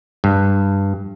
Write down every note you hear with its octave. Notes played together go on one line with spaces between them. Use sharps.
G2